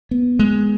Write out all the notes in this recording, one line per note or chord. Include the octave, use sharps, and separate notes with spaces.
B3
G#3